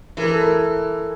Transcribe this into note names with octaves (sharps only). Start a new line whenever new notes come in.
E3 A#4
A4
A#4